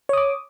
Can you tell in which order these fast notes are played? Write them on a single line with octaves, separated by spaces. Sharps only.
C#5 D#6 D6